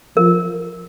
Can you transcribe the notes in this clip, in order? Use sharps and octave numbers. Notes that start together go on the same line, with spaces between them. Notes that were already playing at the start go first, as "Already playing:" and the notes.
F3 A#4